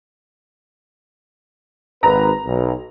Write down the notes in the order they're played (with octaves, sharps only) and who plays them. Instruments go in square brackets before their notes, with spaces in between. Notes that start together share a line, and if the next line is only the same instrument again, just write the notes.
[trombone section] G#1 B4 [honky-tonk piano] A#5
[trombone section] B1